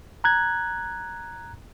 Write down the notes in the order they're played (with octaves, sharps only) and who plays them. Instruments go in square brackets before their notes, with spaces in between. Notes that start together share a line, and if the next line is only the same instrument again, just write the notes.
[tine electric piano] A#5 F#6 G#6